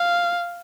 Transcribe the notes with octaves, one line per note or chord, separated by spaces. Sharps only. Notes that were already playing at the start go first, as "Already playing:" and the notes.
Already playing: F5